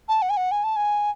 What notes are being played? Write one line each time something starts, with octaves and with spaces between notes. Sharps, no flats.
A5
F#5
G#5
F#5
G#5
A5
G#5